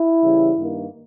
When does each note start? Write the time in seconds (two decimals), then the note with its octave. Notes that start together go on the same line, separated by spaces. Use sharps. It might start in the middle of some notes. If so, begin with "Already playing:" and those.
Already playing: E4
0.23 C#3 E3 G3
0.58 G2 D#3 A#3